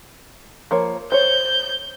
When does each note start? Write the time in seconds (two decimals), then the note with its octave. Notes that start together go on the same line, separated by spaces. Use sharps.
0.71 F3 A#3 C#5
1.12 C5 C#5 G6